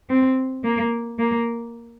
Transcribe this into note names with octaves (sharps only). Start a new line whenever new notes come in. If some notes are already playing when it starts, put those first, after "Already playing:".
C4
A#3
A#3